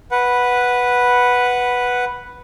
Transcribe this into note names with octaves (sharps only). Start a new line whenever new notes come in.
B4 F#5